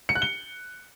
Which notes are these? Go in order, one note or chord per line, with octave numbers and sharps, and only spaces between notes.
C#7
F#6
G7